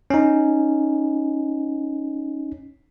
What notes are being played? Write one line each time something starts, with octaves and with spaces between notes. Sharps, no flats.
C#4 D#4